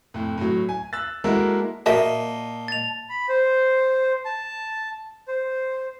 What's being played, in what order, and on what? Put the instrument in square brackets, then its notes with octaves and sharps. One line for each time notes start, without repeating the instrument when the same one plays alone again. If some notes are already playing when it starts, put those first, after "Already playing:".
[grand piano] F2 A2
A2 F#3
G#5
E6 F#6 A6
G#3 A#3 E4 F#4 A4 A#4
[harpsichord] A#2 D#5 [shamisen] F#4 A#4 E5 [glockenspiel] A5
[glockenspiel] A6 F7
[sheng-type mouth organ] B5
C5
A5
C5